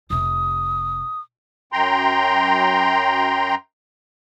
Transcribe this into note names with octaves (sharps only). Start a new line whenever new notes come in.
F1 C3 D#6
F#2 G5 A#5 C6